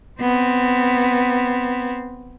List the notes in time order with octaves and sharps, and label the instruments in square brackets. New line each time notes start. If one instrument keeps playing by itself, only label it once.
[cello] B3 C4